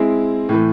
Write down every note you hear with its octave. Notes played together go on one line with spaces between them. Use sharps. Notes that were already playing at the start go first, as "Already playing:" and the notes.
Already playing: G#3 C4 E4 G#4
A2 E3 A3